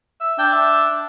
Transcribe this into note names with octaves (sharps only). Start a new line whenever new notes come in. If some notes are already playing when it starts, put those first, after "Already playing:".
E5
D4 G5
E5